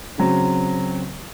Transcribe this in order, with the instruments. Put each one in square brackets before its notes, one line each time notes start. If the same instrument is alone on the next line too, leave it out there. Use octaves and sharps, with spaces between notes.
[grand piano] C#3 F#3 C4